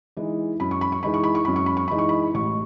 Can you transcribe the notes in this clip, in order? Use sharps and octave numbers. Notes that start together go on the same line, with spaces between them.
E3 G#3 D#4
F#2 B5
C#6
B5
C#6
E3 G#3 D#4 B5
C#6
B5
C#6
F#2 B5
C#6
B5
C#6
E3 G#3 D#4 B5
C#6
B5
A1 C#6